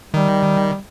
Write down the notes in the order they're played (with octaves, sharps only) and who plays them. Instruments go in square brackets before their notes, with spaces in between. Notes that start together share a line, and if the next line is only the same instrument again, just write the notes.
[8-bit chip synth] D#3 [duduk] G3